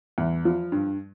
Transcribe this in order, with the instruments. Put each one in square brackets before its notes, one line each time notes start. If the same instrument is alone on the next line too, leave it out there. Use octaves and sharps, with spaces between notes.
[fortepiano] E2
F3
G2